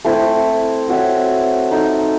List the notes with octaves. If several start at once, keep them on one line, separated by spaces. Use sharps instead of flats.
A3 C4 E4
C4 F#4 C#5 E5
D#4 A4 D#5